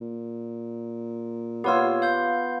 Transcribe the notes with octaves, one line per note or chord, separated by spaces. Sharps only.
A#2
B3 F4 G4 C#5 E6
F5 G6